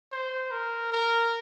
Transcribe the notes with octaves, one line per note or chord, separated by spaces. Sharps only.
C5
A#4
A#4